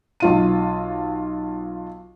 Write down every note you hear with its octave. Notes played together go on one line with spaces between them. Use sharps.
B1 F4 D#7